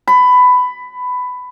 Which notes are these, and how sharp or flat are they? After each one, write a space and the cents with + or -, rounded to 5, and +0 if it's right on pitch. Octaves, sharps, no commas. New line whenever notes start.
B5 +15